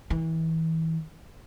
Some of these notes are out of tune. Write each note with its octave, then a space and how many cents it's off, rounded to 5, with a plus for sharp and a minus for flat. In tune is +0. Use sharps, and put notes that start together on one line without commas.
E3 -30